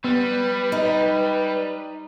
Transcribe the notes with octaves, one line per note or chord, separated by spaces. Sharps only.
G3 B3 B4
D#4